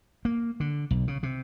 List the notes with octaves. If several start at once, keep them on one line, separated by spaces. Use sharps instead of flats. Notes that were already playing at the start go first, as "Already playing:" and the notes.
A#3
D3
B1
C#3
C3